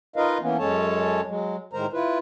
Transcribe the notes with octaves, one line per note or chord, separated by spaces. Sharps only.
D#4 F4 A#4 B4 D#5 F5
E3 A#3 B3 C#4
F#2 G#3 C#4 A4 C#5 A5
F#3 G#3
A2 D#3 G#3 A#4 C5 A#5
E4 F4 B4